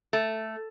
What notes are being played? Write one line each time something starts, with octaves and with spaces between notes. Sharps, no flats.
A3